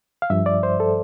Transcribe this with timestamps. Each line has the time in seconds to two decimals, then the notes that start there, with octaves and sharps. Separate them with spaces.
0.22 F5
0.30 G2 F3 E5
0.46 D5
0.63 C5
0.80 A4